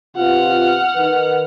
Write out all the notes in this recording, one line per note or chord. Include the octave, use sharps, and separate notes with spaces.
C3 B3 F4 F#5 F6
D#3 B4